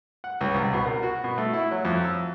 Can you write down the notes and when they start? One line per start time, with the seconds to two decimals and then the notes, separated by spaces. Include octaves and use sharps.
0.24 F#5
0.41 C#2
0.54 C2
0.73 B2
0.85 A#4
1.03 F#4
1.24 B2
1.38 A3
1.53 E4
1.71 F#3
1.85 F2
2.04 E6